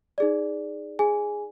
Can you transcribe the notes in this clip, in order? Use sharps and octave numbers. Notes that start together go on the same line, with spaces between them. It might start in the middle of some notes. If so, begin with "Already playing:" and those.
D#4 G#4 D5
G#4 G#5